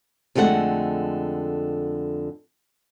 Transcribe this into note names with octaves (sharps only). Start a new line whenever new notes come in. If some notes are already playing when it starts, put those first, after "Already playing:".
F2 D3 G#3 A3 F#5